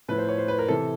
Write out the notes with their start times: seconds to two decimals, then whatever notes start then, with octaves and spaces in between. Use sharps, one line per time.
0.09 A2 F3 B4
0.18 C5
0.29 C#5
0.38 C5
0.48 B4
0.59 A#4
0.68 C3 E3 A4